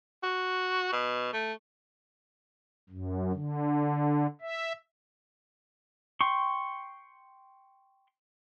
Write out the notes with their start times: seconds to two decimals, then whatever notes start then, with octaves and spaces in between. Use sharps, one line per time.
0.23 F#4
0.93 B2
1.33 A3
2.90 F#2
3.33 D3
4.41 E5
6.21 G5 C6 C#6